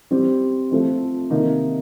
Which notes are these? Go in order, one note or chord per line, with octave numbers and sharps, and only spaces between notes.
G3 C4 G4
F3 A3 C4 F4
C3 D#3 A#3 D#4